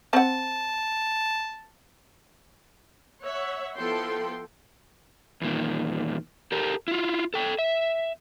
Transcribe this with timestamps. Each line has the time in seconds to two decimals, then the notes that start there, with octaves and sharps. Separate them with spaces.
0.13 C4 F#5 A5
3.22 C#5 E5 F#5
3.75 F3 B3 E4 A4 G5 C6
5.41 E2 A#2 D#3
6.52 G4 A4 A#4
6.88 E4 F4
7.34 A4 G5
7.59 E5